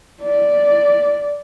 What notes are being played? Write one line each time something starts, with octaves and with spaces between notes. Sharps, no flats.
D5